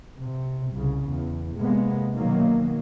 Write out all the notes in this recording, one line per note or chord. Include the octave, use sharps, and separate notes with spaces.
C3
C2 C#3
E2
C3 G#3 A#3 B3
B2 D#3 F#3 A#3